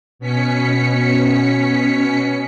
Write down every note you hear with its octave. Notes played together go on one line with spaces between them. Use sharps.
B2 C#4 B6 C#7